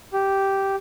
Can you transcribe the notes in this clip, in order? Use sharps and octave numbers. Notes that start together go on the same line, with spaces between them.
G4